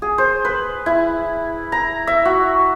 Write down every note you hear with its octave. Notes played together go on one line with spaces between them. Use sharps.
G#4
C5
B4
E4
A#5
E5
F#4